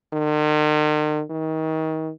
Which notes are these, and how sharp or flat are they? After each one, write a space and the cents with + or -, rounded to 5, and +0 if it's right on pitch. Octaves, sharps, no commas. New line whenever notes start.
D#3 -45
D#3 +30